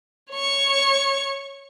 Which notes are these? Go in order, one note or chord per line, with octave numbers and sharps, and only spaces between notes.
C#5 C#6